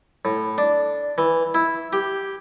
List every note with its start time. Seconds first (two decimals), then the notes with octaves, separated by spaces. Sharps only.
0.25 A2
0.58 D4
1.18 E3
1.55 E4
1.93 G4